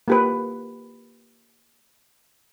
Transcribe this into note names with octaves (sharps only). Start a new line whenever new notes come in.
A#3 G4 B4